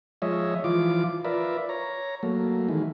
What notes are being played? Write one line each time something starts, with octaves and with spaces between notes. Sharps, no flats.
F3 G#3 C#5 D#5 E5
E3 F3 F4 D6
F4 A#4 B4 D5 E5
C#5 A#5
F#3 A3 A#3
D#3 E3 G#3